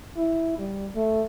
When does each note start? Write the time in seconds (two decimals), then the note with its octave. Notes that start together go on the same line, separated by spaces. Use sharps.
0.17 E4
0.59 G3
0.96 A3